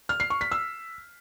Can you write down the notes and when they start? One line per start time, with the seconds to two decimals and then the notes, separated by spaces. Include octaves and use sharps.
0.09 F6
0.20 C7
0.30 C#6
0.41 B6
0.52 E6